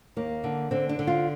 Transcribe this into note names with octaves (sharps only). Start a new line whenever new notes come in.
D#2 A#3
D3
D3 C4
D4
D3
F4